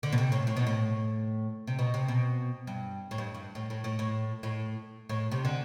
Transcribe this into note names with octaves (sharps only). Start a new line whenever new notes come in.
D3
B2
C3
A2
A2
B2
A2
C3
B2
C3
B2
G2
A2
G2
G2
A2
A2
A2
A2
A2
A2
C3
D3